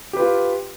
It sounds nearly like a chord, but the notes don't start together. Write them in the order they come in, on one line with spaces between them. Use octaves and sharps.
G4 B4 F4